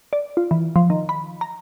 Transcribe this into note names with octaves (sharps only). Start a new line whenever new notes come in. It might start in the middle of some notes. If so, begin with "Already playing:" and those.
D5
F4
E3
F3
D#3
B5
A#5